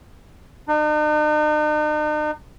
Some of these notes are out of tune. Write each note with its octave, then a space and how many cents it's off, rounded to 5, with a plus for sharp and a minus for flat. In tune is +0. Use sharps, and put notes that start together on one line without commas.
D#4 -45